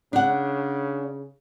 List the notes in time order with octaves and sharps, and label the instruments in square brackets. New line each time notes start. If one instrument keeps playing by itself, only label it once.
[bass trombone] C#3 [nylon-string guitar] D4 F#5